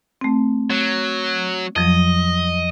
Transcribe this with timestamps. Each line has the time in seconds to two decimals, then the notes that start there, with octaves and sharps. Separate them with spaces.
0.21 A3 C4
0.70 F#3
1.76 F2 F3 F#3 D#5